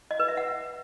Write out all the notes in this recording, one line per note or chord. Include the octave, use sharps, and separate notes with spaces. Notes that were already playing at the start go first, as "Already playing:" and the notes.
D#5
B4
E5
F#5